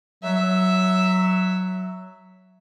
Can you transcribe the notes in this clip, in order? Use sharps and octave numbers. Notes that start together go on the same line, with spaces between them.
F#3 E5